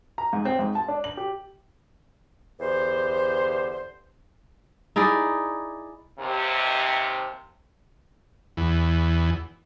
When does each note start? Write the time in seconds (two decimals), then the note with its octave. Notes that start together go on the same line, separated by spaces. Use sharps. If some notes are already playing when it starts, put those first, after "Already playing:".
0.18 A#5
0.33 G#2
0.45 C4
0.59 G#2
0.75 A5
0.88 D4
1.04 F#7
1.17 G4
2.60 E2 D3 G4 C5
4.96 D#4 E4 G#4 D5
6.19 D#2 C3
8.57 E2